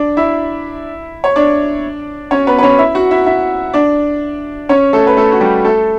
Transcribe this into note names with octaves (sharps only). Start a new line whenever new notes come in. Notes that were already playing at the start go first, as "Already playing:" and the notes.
Already playing: D4 D5
E4 E5
C#5
D4 D5
C#4 C#5
B3 B4
B4
C#4 C#5
E4 E5
F#4 F#5
E4 E5
E4 E5
D4 D5
C#4 C#5
A3 A4
B4
A3 A4
F#4
G3 G4
A3 A4